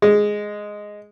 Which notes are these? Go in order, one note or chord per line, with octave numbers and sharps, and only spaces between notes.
G#3